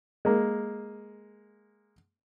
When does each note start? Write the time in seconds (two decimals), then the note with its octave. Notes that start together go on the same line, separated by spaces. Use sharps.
0.25 G#3 A#3